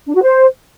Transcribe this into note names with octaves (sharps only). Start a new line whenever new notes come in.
D4
F#4
C5